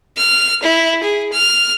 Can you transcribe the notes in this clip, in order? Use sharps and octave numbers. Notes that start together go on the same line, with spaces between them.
F6
E4
G#4
F6